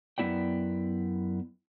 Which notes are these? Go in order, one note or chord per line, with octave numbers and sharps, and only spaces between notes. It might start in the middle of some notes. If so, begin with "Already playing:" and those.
F#2 B3 E4 D5 G5